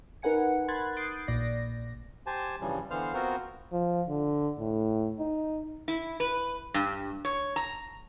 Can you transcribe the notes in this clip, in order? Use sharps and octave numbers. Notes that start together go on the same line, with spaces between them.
D#4 A#4 B4 F#5 G#5 C#7
B5 C6 F#6 G#6 A6
D#6 F#6 G6 A6 C7 D7
A#1 A#2 D5 A#6
G4 C5 G#5 A5
G2 C#3 E3 F3 G3
D3 E3 B3 C5 F5 F6
B3 C4 F4 F#4 A#4 C5
F3
D3
A2
D#4
E4
B4
G2
C#5
A#5